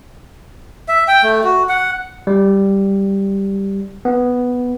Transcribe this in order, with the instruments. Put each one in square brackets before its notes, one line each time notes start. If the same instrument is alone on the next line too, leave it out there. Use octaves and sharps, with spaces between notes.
[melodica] E5
G5
A3
F#4
F#5
[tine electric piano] G3
B3